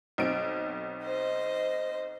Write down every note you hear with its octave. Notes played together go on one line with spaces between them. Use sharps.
B1 C4 D7
C5 D#5